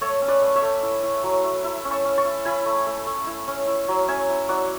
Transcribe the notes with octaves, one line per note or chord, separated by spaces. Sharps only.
A3 A4 C#5
C#4
B4 D5
A3
C#5 E5
A3
E4
E4
F#3
E4
E4
C#4
A5 C#6
C#4
A5 C#6
E4
E4 G#5 B5
A3
A3
A3
E4
C#4
E4
F#3
C#4 E5 G#5
E4
F#3 D5 F#5